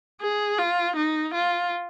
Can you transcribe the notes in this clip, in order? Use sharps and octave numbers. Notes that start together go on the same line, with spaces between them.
G#4
F4
D#4
F4